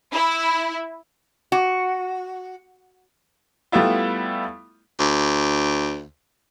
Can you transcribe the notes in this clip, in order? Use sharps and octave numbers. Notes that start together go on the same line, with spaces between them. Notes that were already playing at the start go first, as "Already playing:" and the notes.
E4
F#4
G3 A3 B3 E4 F4
D2